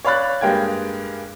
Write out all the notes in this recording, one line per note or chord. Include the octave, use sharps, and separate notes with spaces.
C#5 D5 F5 B5 F#6 A6
G2 G#3 A#3 G5 G#6